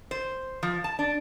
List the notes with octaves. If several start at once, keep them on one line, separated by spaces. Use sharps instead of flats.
C5
F3
A5
D4